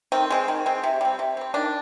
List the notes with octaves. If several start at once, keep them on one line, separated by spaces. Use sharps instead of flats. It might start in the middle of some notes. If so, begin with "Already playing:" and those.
D#3 C4
G#3 C4
D#3
G#3 C4
C3
G3 C4
C3
G3 C4
D#3 D4